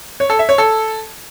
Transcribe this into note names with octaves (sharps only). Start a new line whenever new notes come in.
C#5
A4
E5
C#5
A4